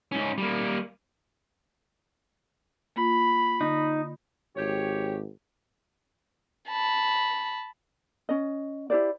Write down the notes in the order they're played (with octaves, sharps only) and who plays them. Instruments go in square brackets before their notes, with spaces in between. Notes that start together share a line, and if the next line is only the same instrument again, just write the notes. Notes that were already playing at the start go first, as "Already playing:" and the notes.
[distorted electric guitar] G#2 C#4
G3 A#3
[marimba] A#3 F4 [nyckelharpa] B5
[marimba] D3 [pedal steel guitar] D#4
[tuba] G#1 [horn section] G4 C#5
[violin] A5 B5
[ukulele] C#4 D#5
E4 G4 C5 D5